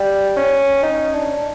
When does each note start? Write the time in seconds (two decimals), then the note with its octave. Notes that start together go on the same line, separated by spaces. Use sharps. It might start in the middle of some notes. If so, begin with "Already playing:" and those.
Already playing: G3
0.36 C#4
0.83 D#4
1.14 D4